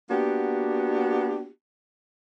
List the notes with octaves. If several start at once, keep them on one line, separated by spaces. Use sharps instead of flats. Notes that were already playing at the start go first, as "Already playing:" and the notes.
A#3 B3 D4 F#4 G4